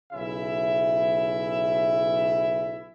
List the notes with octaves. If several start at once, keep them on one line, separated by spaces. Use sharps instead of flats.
B1 C#3 E4 E5